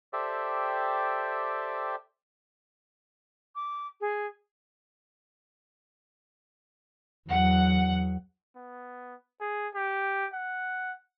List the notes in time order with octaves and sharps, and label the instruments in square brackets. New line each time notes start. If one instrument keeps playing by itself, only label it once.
[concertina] G4 A4 C5 D5 E5 G5
[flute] D6
G#4
[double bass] E2 F#3 [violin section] F#5
[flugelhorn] B3
G#4
G4
F#5